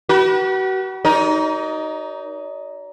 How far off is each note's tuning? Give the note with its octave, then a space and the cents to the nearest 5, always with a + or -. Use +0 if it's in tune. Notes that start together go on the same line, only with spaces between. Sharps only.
F#4 +40 B4 -35
D#4 +5 A#4 +25 D5 -45